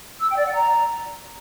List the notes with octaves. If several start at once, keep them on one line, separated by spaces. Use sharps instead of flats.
E6
G5
D5
F#5
A#5